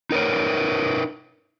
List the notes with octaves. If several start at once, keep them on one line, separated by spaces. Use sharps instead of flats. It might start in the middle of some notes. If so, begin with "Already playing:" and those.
D#4 A#4 B4 C#5